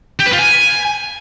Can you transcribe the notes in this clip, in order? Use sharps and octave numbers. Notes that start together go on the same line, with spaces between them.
G4
B4
F4
G#5